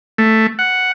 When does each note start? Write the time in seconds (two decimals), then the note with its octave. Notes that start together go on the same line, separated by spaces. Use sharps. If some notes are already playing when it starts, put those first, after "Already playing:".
0.18 A3
0.59 F#5